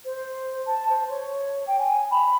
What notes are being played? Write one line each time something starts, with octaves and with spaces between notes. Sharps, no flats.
C5
A5
C5
C#5
G5
G#5
B5